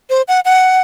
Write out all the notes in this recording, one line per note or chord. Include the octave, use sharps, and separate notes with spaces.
C5
F#5
F#5